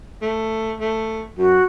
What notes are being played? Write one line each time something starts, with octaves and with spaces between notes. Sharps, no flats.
A3
A3
F#2 F#4